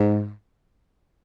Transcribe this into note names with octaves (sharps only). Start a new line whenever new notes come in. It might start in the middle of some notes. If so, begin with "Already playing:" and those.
Already playing: G#2